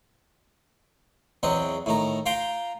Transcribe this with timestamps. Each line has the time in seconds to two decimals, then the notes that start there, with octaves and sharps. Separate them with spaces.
1.43 E2 F#3 C4 D#5
1.86 A2 D#3 A#5
2.26 F4 F5 G5 A#5 C6